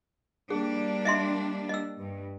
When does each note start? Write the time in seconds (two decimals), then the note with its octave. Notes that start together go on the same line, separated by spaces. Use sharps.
0.50 G3 A#3 D4 G#4
1.05 D#5 E5 C6
1.69 D#5 E6
1.98 G2